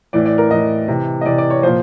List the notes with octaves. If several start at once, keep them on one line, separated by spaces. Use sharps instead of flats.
A2 E3 D5
D5
A#4
A2 E3 D#5
C3 E3
D#5
C3 E3 D5
D5
C#5
A#2 F3 C5